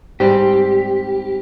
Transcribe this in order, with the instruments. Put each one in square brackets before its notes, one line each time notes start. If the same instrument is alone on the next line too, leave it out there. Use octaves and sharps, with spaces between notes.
[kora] G#2 G3 C4 [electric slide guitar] G4